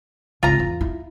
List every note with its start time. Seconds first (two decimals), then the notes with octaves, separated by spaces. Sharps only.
0.43 G#1 C#2 F4 A#5
0.59 E2
0.81 E4